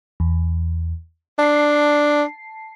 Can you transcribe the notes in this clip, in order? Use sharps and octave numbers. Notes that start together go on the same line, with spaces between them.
E2
D4 A5 C7